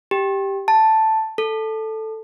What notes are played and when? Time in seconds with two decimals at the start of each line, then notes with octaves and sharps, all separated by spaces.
0.11 G4
0.68 A5
1.38 A4